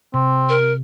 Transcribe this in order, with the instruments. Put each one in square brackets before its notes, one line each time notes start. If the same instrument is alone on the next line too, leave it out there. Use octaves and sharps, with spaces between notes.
[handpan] C3 [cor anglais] C4
[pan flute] A#4